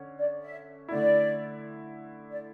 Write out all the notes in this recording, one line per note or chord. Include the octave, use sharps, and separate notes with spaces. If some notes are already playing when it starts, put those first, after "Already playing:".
Already playing: D3 C#4
D5
E5
D3 A3 E4 D5
D5